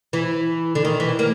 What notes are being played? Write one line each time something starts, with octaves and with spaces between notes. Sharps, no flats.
E3
D3
D#3
E3
A#3